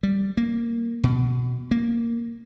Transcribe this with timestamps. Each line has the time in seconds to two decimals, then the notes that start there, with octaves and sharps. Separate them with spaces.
0.03 G3
0.37 A#3
1.04 B2
1.71 A#3